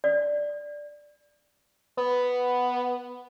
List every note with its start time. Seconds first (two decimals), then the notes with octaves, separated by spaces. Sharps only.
0.04 D5
1.97 B3